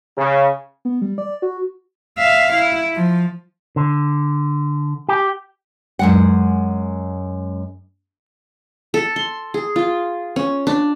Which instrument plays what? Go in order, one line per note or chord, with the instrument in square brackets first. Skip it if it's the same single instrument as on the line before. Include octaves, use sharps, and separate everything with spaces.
[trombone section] C#3
[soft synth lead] B3
G3
D5
F#4
[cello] E5 F5
E4
F3
[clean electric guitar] D3
G4
[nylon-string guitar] F#2 G#3 F#5
[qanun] A4
C6
G#4
F4
C#4
D4